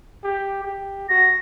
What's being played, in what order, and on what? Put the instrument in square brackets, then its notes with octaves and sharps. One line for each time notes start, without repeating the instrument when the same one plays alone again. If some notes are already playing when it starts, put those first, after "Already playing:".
[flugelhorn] G4
G4
[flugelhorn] F#4 [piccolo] A#6